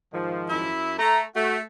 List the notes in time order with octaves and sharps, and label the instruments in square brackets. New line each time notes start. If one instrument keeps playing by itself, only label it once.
[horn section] G#2 D#3 F3
[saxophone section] F#2 E4
[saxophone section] A3 [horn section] A#5
[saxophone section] A3 [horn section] F#4